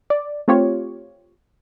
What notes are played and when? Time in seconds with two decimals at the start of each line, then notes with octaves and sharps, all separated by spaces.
0.10 D5
0.48 A3 C4 F4 G4 C#5